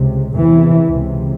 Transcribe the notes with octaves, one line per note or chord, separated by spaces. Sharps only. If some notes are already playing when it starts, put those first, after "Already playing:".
Already playing: C#2 C3
E2 C3 E3
C#2 C3